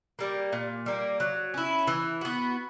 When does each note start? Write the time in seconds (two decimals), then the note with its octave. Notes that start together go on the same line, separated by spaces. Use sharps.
0.19 G3 A#3
0.53 A#2
0.86 G3 A#3
1.20 F#3
1.54 C#4 E4
1.87 E3
2.21 B3 F#4